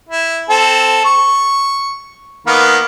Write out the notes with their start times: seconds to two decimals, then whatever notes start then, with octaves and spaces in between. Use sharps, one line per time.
0.09 E4
0.50 C4 A4
1.05 C#6
2.47 D#3 A#3 B3